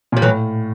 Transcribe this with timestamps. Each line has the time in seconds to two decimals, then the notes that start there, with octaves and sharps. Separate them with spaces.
0.12 A#2 G3
0.22 A2 E3 F#3